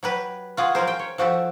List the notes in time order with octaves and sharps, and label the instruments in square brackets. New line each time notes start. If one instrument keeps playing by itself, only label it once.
[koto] F#3 G4 B4
F4 F#4 G#4
F#3 C#4 A#4 C5
G5
C#5
F3 F#4 G4 A4